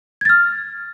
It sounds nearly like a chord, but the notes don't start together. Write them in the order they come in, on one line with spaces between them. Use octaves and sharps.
G#6 A6 F6